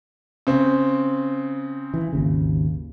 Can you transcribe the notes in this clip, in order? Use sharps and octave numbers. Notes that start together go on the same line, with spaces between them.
C#3 C4
E3
G#1 D#2 C#3